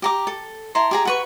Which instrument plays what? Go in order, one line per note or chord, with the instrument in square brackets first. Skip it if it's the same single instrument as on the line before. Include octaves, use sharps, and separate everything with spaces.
[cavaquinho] G4 A#5 D6
A4
E4 A5 A#5 C6
G4 G#4 A#5
F#4 B4 C#6